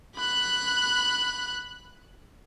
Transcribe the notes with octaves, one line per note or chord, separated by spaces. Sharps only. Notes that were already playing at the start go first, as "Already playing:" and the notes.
B5 F#6